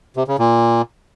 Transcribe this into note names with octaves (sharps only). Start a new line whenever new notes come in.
C3
C#3
A#2